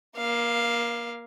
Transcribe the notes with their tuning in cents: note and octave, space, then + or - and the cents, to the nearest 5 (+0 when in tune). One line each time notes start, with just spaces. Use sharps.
A#3 +25 F5 +0